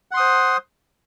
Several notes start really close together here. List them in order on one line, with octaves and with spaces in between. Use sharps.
F#5 C6 D#6 C5